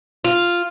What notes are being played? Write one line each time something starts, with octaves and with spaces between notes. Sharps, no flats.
F4